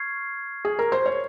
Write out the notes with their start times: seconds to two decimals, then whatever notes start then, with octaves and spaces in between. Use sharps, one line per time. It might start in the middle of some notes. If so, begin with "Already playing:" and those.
Already playing: C#6 F6 G#6 C7
0.65 G#4
0.79 A#4
0.92 C5
1.06 C#5